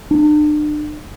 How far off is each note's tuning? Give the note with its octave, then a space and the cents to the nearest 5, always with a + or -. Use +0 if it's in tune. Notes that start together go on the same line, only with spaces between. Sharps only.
D4 +40